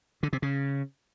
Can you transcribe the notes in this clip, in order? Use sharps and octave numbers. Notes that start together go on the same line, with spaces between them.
D3
C3
C#3